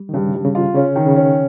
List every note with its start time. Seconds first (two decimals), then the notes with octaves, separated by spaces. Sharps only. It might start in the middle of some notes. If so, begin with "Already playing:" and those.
Already playing: G3
0.09 D#3
0.14 G2 C#3
0.34 G2
0.44 C#3
0.55 F4
0.75 C#3 C#4
0.96 D#3
1.06 C#3
1.16 C#4